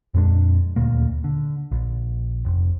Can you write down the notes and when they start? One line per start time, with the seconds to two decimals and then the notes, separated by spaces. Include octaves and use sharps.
0.14 F2 A#2 G#3 D4
0.76 D#1 D2 A#2 A#3
1.24 D3
1.71 A#1
2.45 F1